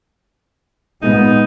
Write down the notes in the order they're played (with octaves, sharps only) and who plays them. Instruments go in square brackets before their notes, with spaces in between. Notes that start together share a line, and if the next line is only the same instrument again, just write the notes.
[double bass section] A#2 G#3 B3 [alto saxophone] D#4